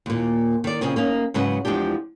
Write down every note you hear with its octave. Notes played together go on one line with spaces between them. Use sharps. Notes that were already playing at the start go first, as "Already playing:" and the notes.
D#2 A#2
D#3 D5
A#2 C#3 C4 G#4
A#3 C#4 D#4
G#2 C#3 F#3 B4 F#5
E2 F3 G#3 D4 G4